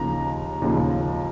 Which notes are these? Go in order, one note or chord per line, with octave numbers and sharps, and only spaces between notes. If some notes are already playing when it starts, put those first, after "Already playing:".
Already playing: D#2 C#3 F3 A#5
D#2 C#3 F3